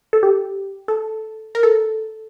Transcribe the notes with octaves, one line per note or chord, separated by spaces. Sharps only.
A4
G4
A4
A#4
A4